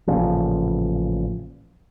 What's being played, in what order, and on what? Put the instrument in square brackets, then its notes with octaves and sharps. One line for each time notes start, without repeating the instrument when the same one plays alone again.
[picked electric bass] A1 A#2 C#3 F3